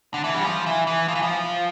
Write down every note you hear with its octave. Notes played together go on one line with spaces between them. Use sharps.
D3
E3
G3
F3
E3
E3
F3
E3
F3